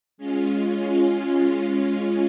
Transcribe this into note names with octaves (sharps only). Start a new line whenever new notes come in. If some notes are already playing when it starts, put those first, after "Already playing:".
G#3 C#4 F4